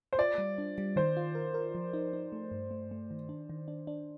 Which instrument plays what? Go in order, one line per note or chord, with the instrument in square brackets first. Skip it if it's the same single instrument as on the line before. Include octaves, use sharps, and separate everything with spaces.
[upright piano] C5
[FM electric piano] F4 [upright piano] D5
[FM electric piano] G3
D4
G3
[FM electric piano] D#3 [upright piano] C5
[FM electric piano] F4
A#4
A#4
F3
D#4
D#4
A3
G2
A3
A3
D#3
D4
D#3
D4
D4